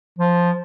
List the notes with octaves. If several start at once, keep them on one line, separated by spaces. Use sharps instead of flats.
F3